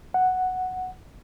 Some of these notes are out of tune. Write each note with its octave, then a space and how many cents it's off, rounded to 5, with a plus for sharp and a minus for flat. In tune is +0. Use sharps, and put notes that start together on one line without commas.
F#5 +0